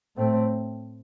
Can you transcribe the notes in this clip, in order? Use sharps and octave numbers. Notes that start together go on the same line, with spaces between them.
A2 A3 C4